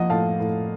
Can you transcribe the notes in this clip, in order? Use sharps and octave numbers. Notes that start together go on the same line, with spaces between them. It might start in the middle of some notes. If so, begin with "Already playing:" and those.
Already playing: F3 A#3 D#5 F#5
A2 F5 A5
A2